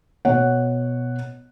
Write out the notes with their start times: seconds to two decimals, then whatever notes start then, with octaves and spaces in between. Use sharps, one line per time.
0.25 B2 C#5 F#5